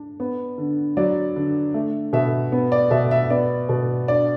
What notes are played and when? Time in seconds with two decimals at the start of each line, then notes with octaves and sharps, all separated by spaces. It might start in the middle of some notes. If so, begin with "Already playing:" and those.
Already playing: D4
0.20 B3
0.58 D3
0.97 F#3 D5
1.36 D3
1.74 A3
2.13 B2 E5
2.52 B3
2.72 D5
2.91 B2 E5
3.11 E5
3.30 B3 D5
3.69 B2
4.08 D4 D5